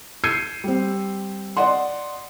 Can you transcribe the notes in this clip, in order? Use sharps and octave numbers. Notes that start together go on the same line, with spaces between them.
E6 G6 G#6 C7 C#7 D#7
G3 C4
D5 D#5 F#5 C6